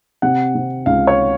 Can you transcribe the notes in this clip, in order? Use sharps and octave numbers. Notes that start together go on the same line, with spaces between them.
C3 F#5
C3
C#2 F5
C#5